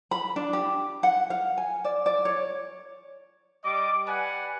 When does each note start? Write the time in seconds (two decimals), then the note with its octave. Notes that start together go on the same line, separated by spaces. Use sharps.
0.11 B5
0.36 D4
0.53 G4
1.03 F#5
1.30 F5
1.58 G#5
1.85 D5
2.06 D5
2.25 C#5
3.63 G3 D#5 D6
4.07 G4 B4 D5 F#5 G#5